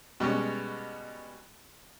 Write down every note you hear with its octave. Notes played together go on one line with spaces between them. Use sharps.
B2 G3 G#3 C#4